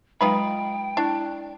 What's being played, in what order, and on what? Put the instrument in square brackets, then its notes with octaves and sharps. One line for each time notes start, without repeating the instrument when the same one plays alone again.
[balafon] F#3 G#3 B4 [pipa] D#4 F4 B5 [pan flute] G5
[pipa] D4 [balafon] E4